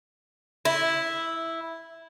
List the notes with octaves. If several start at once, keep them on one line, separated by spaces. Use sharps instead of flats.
E4